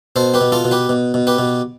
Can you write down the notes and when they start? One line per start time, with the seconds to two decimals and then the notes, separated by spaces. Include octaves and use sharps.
0.16 B2 A4 C5
0.34 G4 B4
0.41 B2
0.52 F4 A4
0.65 B2
0.71 G4 B4
0.89 B2
1.14 B2
1.27 G4 B4
1.38 B2